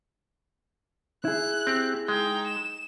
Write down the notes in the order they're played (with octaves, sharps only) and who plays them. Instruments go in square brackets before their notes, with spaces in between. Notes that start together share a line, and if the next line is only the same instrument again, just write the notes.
[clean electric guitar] E4 G#4 [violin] F#6
[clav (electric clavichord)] C4 G4
[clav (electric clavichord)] G#3 [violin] D#4 G5
[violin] E7